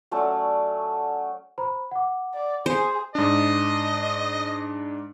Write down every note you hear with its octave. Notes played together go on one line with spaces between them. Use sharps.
F#3 A3 C#4 D5
C5 A#5 B5
F#5 D6
D5
G#4 C5
G#2 D4 D#5